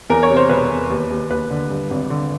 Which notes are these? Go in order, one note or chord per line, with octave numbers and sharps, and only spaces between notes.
E2 A#4
C#5
C3
C5
E1 B4
E1
D#2
D#2
D#2 B4
D3
G2
G#1
D3